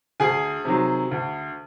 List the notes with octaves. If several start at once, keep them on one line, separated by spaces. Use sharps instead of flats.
D2 G#4 G#5
C3 D#3 F#3
D2